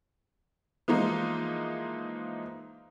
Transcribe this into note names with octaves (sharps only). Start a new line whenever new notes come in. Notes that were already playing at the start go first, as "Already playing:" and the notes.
E3 F3 G#3 A#3 D#4 F4